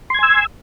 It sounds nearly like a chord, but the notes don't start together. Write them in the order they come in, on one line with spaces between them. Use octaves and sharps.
C6 G#6 G#5 E6